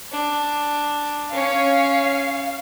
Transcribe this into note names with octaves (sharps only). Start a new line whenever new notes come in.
D4
C#4 C#5 F5